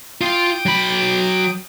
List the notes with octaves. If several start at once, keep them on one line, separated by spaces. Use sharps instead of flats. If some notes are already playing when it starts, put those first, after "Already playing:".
F4 G5 D6 D#6
F#3 B5